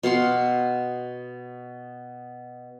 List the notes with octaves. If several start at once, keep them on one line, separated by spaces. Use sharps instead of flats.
B2 F5 F#5 C6